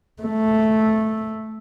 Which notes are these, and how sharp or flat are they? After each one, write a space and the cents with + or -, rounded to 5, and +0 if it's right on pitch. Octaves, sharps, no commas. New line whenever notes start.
A3 -5